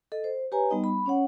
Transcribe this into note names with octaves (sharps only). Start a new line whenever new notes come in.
A4 D#5
C5
G4 B4 C#5 G#5 A#5
G3 B3 D#4 D#5
B5
C#4 C#5 F#5